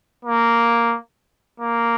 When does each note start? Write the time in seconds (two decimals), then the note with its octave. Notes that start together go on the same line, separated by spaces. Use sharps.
0.25 A#3
1.60 A#3